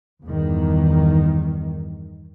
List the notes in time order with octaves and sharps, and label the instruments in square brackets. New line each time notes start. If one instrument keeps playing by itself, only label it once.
[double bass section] E2 G2 D#3